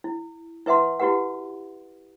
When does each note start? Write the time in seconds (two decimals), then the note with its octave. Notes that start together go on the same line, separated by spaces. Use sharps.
0.04 E4
0.66 E4 B4 E5 F#5 C6
1.00 E4 F#4 G4 B4 F#5